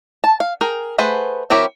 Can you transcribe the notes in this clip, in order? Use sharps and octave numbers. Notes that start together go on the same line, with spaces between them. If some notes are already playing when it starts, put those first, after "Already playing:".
A5
F5
G#4 A#4 G5
A3 G#4 B4 C5 F#5
F#3 C4 E4 G4 A#4